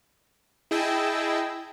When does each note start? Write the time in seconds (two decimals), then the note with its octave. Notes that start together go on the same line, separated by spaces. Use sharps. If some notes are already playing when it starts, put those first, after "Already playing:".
0.71 E4 G#4 D#5 G5 A5 E6